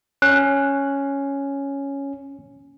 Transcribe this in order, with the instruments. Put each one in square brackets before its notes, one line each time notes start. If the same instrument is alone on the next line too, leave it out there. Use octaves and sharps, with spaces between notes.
[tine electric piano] C#4 [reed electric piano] F#6